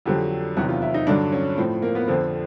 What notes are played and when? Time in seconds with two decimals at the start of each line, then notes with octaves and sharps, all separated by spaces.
0.06 F2 D3 F#3 G4
0.56 E2 C3 D#3 F#3 F#4
0.69 F4
0.82 E4
0.94 D#4
1.07 G2 D3 F#3 D4
1.32 C#4
1.58 A2 F3 C4
1.82 A#3
1.95 B3
2.07 F2 D3 F3 C4